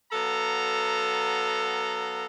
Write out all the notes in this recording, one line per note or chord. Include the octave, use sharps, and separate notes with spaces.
F#3 B3 A4 F5 A#5